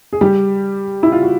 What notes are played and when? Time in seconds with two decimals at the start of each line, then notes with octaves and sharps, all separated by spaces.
0.13 G#4
0.21 G3 G4
1.03 E4
1.12 F4
1.23 F#4